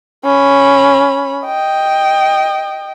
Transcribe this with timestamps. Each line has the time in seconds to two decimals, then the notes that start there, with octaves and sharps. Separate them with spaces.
0.24 C#4 B5
1.46 D#5 G5